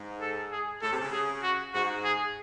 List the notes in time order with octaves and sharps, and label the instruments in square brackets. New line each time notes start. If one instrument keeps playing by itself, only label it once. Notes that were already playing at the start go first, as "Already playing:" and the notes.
Already playing: [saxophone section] G#2
[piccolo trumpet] A4
G#4
[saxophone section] A2 [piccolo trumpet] A4
[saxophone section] C3
C#3
[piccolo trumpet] G#4
F#4
[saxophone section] G#2 [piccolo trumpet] F#4
[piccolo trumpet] G#4